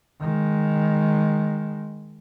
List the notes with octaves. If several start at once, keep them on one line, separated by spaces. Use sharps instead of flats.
D#3 G#3